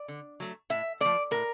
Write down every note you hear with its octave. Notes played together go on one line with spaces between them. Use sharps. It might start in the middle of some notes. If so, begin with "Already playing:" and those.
Already playing: D5
D3
F#3 A3
A2 E5
F3 A3 D5
A2 A#4